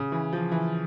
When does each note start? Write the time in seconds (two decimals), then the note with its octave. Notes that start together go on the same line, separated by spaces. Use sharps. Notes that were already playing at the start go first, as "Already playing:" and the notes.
Already playing: C#3
0.12 E3
0.33 F3
0.52 E3